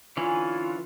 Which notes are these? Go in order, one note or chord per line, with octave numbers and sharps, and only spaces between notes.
D3 E3 C#4 F4 G#5